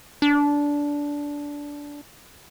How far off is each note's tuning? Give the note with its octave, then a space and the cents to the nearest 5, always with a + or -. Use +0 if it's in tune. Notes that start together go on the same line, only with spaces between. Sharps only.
D4 -15